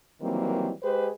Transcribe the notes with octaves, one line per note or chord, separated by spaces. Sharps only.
D#3 E3 F#3 G3 A#3 C4
G#3 G4 G#4 B4 C5